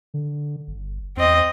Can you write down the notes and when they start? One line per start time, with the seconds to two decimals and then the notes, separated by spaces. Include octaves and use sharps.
0.14 D3
0.67 G1
1.17 E2 C4 D#5